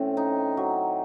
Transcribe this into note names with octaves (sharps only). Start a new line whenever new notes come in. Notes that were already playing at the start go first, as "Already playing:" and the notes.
Already playing: A2 C4 C#4
D#4
F#3